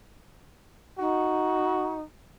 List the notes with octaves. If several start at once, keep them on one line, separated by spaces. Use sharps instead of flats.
D#4 F#4